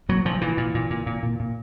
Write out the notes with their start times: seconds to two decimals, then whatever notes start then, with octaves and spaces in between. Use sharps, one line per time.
0.09 A#2 F#3
0.25 A#2 F3
0.41 A#2 E3
0.57 A#2
0.74 A#2
0.90 A#2
1.06 A#2
1.23 A#2
1.40 A#2